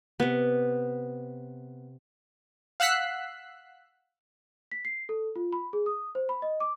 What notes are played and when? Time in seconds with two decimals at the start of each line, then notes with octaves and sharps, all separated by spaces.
0.20 C3 B3
2.80 F5 F#5 E6 F#6 B6 C7
4.71 B6
4.85 C7
5.09 A4
5.36 F4
5.53 B5
5.73 G#4
5.86 D#6
6.15 C5
6.29 B5
6.42 D#5
6.60 D6